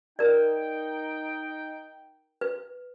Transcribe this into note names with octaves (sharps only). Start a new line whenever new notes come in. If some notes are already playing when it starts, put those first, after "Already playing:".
D#4 A#4 D5 G5
B4